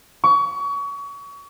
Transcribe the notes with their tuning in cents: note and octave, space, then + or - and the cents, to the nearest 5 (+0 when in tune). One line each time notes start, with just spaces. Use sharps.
C#6 +30